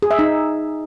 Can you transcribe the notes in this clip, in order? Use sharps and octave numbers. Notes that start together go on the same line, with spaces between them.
G#4
E5
D#4